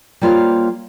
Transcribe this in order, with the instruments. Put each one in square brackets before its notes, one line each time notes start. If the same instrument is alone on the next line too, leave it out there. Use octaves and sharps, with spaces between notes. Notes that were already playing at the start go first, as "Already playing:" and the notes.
[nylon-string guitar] G3 A#3 F4 C5 C#5 F5